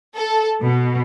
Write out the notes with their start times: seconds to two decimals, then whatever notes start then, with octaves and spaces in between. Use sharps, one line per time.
0.16 A4
0.63 B2